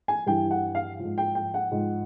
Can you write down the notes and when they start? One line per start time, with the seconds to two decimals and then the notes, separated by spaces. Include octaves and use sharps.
0.08 G#5
0.26 G2 E3 G5
0.51 F#5
0.75 F5
0.99 G#2 F3
1.18 G5
1.35 G5
1.54 F#5
1.71 G#2 F3